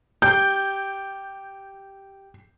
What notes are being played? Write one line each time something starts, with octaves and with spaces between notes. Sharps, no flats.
G4 G6